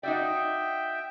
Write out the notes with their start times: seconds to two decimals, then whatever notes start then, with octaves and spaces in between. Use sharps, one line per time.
0.03 D#4 F#4 D5 E5 G5